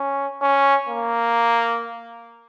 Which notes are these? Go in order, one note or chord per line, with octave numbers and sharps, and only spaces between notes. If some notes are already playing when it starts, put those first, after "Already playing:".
Already playing: C#4
C#4
A#3